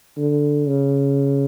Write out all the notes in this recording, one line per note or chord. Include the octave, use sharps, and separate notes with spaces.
D3
C#3